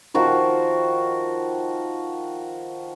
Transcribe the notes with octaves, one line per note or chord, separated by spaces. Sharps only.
D#3 F3 F#4 C5